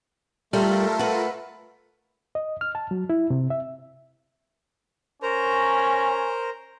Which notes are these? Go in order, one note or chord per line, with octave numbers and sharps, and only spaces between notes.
G3 A3 F4 A4 A#4
B4 F#5
D#5
F6
A5
F#3
E4
C3
E5
C#4 A#4 C5 A#5